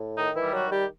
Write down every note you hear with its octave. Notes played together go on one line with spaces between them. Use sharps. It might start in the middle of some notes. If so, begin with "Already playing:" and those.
Already playing: A2
D#3 D#4
E3 E4
G3
F#3 F#4
D#3
G3 G4